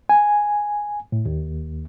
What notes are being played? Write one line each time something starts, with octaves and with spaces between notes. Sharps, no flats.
G#5
A2
D#2